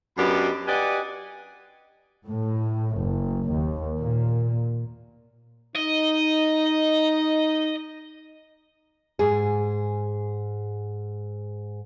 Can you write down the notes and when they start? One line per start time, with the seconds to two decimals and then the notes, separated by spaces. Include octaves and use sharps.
0.18 F#2 B3 D4 G4 D#5 B5
0.67 G4 B4 D5 D#5 F#5 G#5
2.27 A2
2.97 F#1
3.50 D#2
3.99 A#2
5.76 D#4 D#5
9.19 G#2 G#4